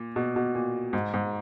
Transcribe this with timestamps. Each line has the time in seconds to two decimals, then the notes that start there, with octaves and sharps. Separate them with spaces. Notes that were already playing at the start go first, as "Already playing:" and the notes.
Already playing: A#2
0.16 B2
0.36 B2
0.55 A#2
0.93 G#2
1.14 G#2